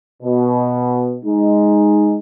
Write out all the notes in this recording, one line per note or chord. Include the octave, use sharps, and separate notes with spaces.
B2
G#3 D#4